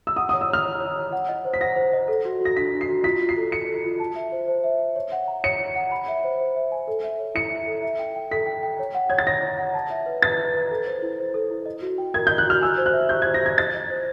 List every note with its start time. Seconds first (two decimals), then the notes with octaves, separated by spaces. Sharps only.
0.07 E6
0.16 F#5 D#6
0.29 D#6
0.33 C#5
0.41 E6
0.49 C#5 F6
0.65 C#5
0.80 C#5
0.97 C#5
1.12 F#5
1.29 D#5
1.45 C5
1.53 B6
1.61 F#5 A#6
1.76 C5
1.93 D#5
2.08 A4
2.25 F#4
2.40 F#4 A#6
2.56 D4 B6
2.73 D4
2.81 C7
2.89 F#4
3.04 F4 B6
3.21 F4
3.29 C7
3.37 A4
3.52 A4 C#7
3.68 A4
3.84 F4
4.00 A5
4.16 E5
4.32 C5
4.48 C5
4.64 E5
4.79 E5
4.96 C#5
5.12 F#5
5.28 A#5
5.44 C#5 C#7
5.60 C#5
5.75 F#5
5.92 B5
6.08 E5
6.24 C5
6.40 C5
6.56 E5
6.72 G#5
6.88 A4
7.04 E5
7.19 C#5
7.35 E4 C#7
7.51 E5
7.67 A4
7.83 E5
7.99 G5
8.16 G5
8.31 A4 B6
8.46 G5
8.63 G5
8.79 C#5
8.95 F#5
9.10 C#5 G#6
9.18 A6
9.27 C#5 A#6
9.42 C#5
9.58 F#5
9.74 A5
9.90 E5
10.06 B4
10.22 B4 A6
10.39 B4
10.54 B4
10.70 A4
10.86 C5
11.02 E4
11.19 C5
11.34 A4
11.51 E4
11.66 D#5
11.82 F#4
11.98 G5
12.14 A#4 G#6
12.27 G6
12.30 D#5
12.38 F#6
12.46 F#4 F6
12.61 G#5 E6
12.78 C5
12.86 F#6
12.93 E5
13.09 G4 G6
13.22 G#6
13.25 C5
13.34 A#6
13.41 G4 G#6
13.58 D#5 A6
13.74 D#5
13.90 C5